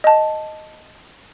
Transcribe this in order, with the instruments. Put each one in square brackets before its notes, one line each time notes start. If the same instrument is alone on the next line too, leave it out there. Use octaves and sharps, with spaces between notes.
[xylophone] D#5 A5